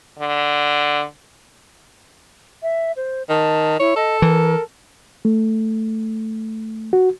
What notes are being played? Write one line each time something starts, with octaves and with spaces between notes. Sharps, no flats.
D3
E5
C5
D#3 A5
E4 C#5
A4 D#5
E3 A#4
A3
F#4